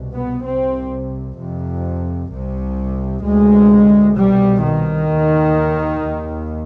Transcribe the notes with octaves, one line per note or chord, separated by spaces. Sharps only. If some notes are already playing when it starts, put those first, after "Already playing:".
Already playing: C2 B2
B3
C2 C3 C4
F2 C3
C2 C3
D2 C3 G#3
C2 B2 G3
D#3
D#2
D#2